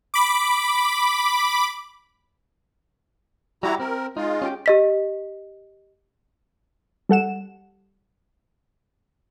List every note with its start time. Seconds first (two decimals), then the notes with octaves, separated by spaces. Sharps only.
0.14 B5 D6
3.63 G3 E4 F#4 G4 A#5
3.80 C4 A#4
4.17 G#3 D#4 F4
4.42 C#4 G4 G5
4.66 G4 D#5 B6
7.09 G3 A4 F#5 E7